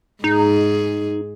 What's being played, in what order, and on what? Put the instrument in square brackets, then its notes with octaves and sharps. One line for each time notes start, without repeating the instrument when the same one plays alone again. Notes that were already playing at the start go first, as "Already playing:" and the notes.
[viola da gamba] G#2 G#4 [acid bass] D#4